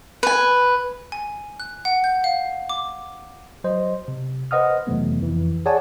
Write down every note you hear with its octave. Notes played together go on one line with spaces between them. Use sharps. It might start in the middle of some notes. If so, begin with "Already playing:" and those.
B4 G#5
G#5
F#6
F#5
G6
F5
D6
F#3 C5 D#5
C3
B4 C5 D#5 F#5 D#6 F6
F2 C3 E3 F#3 A3 B3
F2 E3
G#4 C#5 D5 F#5 G#5 A5